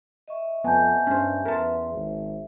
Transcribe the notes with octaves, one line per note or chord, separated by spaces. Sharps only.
D#5 E5 C#6
F2 B3 G#5 A5 G6
G2 C#4 C5
E2 A#4 B4 E5 A5 C6
G#1 C5